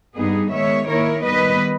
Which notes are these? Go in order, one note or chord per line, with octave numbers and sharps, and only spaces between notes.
G2 G3 B3 D#4 G#4
D#3 G#3 B3 C#5 E5
D#3 A#3 E4 A#4 C#5
D#3 G3 B3 B4 D#5